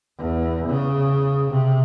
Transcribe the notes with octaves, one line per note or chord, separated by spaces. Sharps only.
E2
C#3
C3